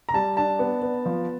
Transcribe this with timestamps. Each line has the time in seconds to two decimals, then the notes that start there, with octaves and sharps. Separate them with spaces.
0.09 A#5
0.14 G3 A5
0.37 D4 A5
0.59 B3
0.82 B3
1.06 F3